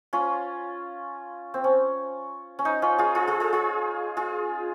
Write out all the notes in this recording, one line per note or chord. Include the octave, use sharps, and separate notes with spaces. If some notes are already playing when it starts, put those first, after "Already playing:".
C#4 F4
C4
C#4
C#4
D#4
C#4 F4
F4 G#4
F4 G#4
F4 G#4
F4 G#4
F4 G#4
F4 G#4